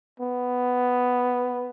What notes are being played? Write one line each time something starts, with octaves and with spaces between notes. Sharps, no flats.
B3